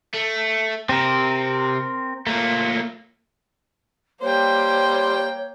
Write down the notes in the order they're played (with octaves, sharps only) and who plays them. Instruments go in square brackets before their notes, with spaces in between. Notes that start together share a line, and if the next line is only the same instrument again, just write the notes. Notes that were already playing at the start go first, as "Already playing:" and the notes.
[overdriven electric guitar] A3
[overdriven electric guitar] C3 [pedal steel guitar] C4 A#4
[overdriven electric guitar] A#2 A3 [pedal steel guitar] A#3
[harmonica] G3 C5 [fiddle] A#3 G5 [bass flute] C#5